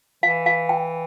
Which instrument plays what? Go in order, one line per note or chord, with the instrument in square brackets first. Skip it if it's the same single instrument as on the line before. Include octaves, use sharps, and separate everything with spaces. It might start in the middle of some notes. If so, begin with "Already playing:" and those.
[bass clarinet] E3 [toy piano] F5
[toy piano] F5
G5